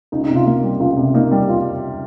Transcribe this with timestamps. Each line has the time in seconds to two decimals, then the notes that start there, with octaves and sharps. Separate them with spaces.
0.12 C#2 D#4
0.24 D#4
0.29 C3
0.35 F4
0.46 A#3
0.63 G3
0.80 C#2 F4
0.97 C3
1.14 A#3 D#4
1.32 G3
1.49 F4